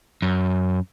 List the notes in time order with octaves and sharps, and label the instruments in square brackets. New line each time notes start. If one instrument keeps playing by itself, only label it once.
[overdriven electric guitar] F#2